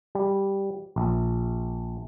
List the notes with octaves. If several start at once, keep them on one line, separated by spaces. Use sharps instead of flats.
G3
A#1